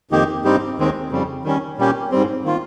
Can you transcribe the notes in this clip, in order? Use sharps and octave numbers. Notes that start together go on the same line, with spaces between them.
F2 D#3 A#3 D#4 G4
G2 G3 C4 D#4 G4
D#2 D#3 G#3 C4 D#4
F2 C#3 G3
D#3 G3 C#4
A#2 G3 A#3 C#4 G4
G#2 G3 C4
D#3 A#3 F4